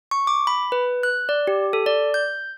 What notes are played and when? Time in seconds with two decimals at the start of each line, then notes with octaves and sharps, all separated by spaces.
0.11 C#6
0.27 D6
0.47 B5
0.72 B4
1.03 F#6
1.29 D5
1.47 G4
1.73 A4
1.86 D5
2.14 G6